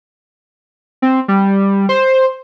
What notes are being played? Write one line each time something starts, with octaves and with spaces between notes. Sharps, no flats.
C4
G3
C5